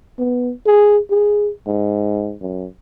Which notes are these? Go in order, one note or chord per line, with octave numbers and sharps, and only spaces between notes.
B3
G#4
G#4
G#2
F#2